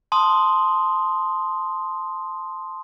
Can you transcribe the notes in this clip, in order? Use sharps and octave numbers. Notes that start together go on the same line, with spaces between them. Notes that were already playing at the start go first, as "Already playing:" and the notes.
A5 C6 D#6